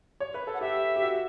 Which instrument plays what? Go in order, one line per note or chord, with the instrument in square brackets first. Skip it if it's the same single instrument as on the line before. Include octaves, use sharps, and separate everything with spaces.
[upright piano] C#5
B4
A4
[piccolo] F#5
[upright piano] G4 [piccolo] E5
[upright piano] G4
F#4